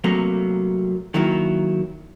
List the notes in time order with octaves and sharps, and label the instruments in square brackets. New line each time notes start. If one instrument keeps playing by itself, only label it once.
[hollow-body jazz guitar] C3 F#3 G3 A3 A#3
D#3 F#3 A#3 E4